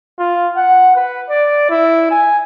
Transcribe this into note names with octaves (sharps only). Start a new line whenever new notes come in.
F4
F#5
B4
D5
E4
G#5